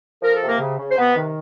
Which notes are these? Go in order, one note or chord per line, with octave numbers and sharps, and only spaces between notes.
F3 A#4
A4
C3
A#3 A#4
C#3
C#3
C5
C3 B3 B4
D#3